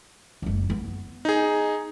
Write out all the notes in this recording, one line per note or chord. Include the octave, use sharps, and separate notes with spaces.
F#1 C#2
B3
D#4 G#4